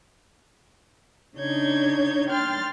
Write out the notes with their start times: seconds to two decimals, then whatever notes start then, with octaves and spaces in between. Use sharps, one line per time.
1.36 C#3 D4 D#4 C#5 G6 G#6
2.28 G5 C6 F6 A6